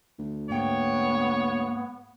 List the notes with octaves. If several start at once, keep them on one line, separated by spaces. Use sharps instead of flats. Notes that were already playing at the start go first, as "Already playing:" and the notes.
D2
G#2 A#3 B3 C#5 G5